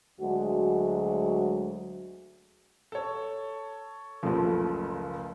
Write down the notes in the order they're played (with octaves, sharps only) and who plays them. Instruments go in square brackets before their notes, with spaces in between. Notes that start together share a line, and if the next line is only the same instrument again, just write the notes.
[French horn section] D2 F#3 G#3 F#4
[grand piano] A4 C#5
[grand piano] F#1 C#2 [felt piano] F3 A3